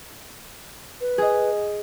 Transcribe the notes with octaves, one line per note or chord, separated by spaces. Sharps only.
B4
G#4 D#5